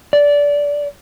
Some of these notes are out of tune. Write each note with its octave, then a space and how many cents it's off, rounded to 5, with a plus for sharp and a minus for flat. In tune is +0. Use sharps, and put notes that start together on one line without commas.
D5 -20